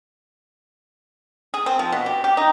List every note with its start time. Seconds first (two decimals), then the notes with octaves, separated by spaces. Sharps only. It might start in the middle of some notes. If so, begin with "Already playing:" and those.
1.54 G#4
1.66 C4
1.79 F3
1.92 B2
2.06 G4
2.24 G4
2.37 D#4